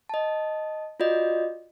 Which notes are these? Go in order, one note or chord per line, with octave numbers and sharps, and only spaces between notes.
D#5 A5
F4 F#4 D5 D#5